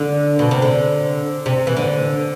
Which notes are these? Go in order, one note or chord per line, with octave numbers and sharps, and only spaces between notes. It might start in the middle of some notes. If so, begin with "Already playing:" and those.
Already playing: D3
B2
C3
D3
C3
E3
D3